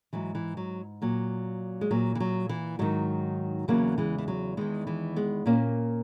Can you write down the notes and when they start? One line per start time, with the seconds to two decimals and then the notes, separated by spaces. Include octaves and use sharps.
0.13 G#2 E3 F#3
0.35 E3
0.57 F#3
1.02 A#2 F#3
1.81 G#3
1.91 A#2 F#3
2.15 E3
2.20 F#3
2.49 E3
2.79 G#2 D#3 F#3
3.68 E2 C#3 E3 F#3 A#3
3.98 E3 G#3
4.18 E3
4.28 F#3
4.57 E2 D#3 E3 G#3
4.87 E3 G#3
5.16 G#3 B3
5.46 A#2 A#3 C#4